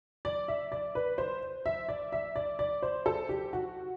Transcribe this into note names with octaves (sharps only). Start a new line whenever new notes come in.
D5
E5
D5
B4
C5
E5
D5
E5
D5
D5
C5
A4
G4
F#4